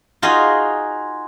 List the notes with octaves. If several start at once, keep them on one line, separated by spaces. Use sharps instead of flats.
D#4 F4 F#4 G#4 D#5 F5